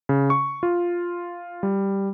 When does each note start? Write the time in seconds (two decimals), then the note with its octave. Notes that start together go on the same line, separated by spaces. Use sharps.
0.09 C#3
0.30 C#6
0.63 F4
1.63 G3